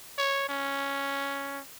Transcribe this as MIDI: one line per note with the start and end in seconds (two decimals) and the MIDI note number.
0.18 0.45 73
0.49 1.60 61